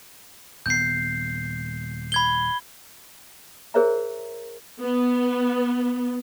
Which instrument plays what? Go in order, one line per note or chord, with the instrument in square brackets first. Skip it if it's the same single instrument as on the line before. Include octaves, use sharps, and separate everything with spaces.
[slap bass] D#1 B3 [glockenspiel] G6 C7
[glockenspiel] B5 G#6 G7
[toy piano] G#4 A#4 C5 C#5 E5 A#5
[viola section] B3